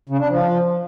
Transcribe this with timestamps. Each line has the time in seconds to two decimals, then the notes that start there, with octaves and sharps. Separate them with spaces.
0.09 C#3
0.19 D4
0.29 F3